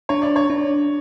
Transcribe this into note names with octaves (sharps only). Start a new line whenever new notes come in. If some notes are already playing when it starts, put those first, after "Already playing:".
D4 C#5
D5
C#5
D4